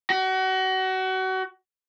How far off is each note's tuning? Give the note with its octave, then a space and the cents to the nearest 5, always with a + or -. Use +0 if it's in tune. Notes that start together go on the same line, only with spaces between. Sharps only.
F#4 +30